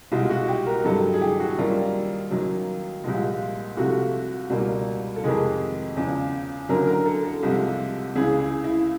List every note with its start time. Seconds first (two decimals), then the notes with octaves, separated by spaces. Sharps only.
0.12 C2 B2 G#3 F4
0.30 F#4
0.48 G4
0.66 A#4
0.84 G2 D#3 F#3 A4
1.13 G#4
1.21 G4
1.40 F#4
1.58 F#2 D#3 G3 A#3 F4
2.31 F#2 D#3 F#3 A#3
3.04 C2 A#2 F3 G#3
3.77 C2 C3 F3 A3 F#4
4.50 C#2 B2 G3 A#3
5.16 A4
5.24 F2 C3 D#3 G#3 G#4
5.96 E2 C#3 F3
6.69 F#2 D3 F#3 A#4
6.87 A#4
7.06 A4
7.24 A4
7.43 C2 C3 F3 G#3
8.16 C#2 C#3 E3 G#4
8.40 G#4
8.64 E4